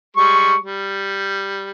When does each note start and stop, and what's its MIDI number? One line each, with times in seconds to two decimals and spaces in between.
0.17 0.55 55
0.17 0.55 56
0.17 0.55 85
0.61 1.71 55